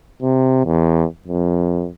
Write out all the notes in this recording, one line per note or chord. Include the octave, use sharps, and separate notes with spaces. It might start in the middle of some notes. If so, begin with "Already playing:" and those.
C3
E2
F2